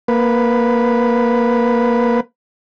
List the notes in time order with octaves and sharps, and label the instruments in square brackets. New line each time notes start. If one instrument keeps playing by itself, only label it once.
[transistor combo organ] A#3 B4